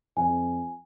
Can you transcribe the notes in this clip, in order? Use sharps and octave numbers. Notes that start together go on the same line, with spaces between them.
F2 G#5